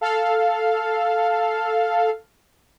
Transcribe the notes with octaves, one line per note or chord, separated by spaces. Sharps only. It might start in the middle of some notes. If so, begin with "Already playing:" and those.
A4 F5